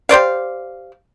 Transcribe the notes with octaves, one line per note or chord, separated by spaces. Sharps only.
G4 C5 D5 F5